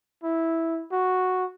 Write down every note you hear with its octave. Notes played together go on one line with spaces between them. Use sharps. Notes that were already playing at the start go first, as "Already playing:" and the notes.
E4
F#4